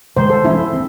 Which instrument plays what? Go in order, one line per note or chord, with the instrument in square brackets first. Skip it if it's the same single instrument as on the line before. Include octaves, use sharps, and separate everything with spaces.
[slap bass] C3 D#3 G#3 [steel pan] C5
[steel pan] A4
[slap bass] E3 G#3 C#4 [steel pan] E4
[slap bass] C4